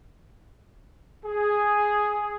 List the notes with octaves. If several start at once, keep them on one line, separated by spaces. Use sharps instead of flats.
G#4